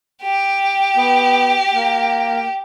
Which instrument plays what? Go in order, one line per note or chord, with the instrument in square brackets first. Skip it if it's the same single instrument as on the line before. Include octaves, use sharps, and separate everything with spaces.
[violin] G4
[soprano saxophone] B3
A#3